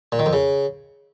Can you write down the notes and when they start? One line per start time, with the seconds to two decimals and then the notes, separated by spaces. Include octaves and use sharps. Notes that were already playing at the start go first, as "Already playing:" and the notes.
0.12 A#2
0.19 D#3
0.26 F2
0.33 C#3